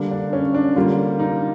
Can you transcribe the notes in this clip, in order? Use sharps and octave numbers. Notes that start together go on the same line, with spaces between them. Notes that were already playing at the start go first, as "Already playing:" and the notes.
Already playing: D3 G3 A#3
D4
C#4
D4
D3 G3 A#3 F4
D#4